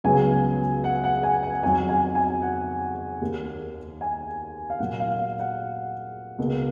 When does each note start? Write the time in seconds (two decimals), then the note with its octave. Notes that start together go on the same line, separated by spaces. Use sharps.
0.04 C#2 C#3 F#3 B3 G#5
0.84 F#5
1.04 F#5
1.23 G#5
1.43 F#5
1.63 F2 D#3 F#3 G#5
1.89 G#5
2.15 G#5
2.42 F#5
3.21 D#2 D#3 A#3
4.01 G#5
4.70 F5
4.79 A#2 F#3 A#3 F#5
5.00 F5
5.19 F5
5.40 F#5
6.39 C#2 B2 A#3